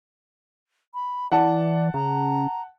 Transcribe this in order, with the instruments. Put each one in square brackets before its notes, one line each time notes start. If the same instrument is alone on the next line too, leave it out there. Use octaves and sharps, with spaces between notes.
[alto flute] B5
[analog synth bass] E3 [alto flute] D5 [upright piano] F#5 A5
[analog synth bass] C#3 [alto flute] A#5